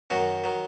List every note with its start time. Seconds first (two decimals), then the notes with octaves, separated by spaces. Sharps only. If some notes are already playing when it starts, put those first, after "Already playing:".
0.10 F#2 D#3 F#3 F#4
0.44 D#3 F#3